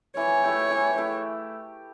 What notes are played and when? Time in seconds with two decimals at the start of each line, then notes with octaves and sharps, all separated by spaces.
0.16 E3 C#5
0.43 A3 E4 G4
0.70 E3
0.98 A3 E4 G4